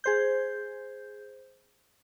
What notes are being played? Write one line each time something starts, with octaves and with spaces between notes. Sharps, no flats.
G#4 C5 G6